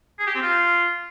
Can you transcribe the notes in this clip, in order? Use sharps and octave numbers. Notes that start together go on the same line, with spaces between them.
G#4
G4
C4
F4